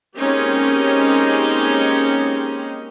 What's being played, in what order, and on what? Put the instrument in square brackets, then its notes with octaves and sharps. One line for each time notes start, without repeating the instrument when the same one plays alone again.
[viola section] G#3 A#3 C4 C#4 D#4 G4